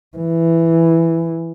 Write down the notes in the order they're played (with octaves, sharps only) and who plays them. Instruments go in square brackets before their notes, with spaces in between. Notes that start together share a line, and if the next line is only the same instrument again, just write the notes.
[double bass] E3